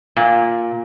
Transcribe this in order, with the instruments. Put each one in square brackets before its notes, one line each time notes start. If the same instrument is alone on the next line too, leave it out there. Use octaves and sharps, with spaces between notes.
[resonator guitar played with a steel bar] A#2